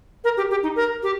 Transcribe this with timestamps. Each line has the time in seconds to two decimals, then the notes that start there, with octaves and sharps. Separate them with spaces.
0.24 A#4
0.37 G4
0.50 G4
0.63 D#4
0.76 A#4
1.03 G4